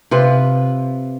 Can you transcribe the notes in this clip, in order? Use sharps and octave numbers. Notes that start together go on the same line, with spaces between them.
C3 F4 B4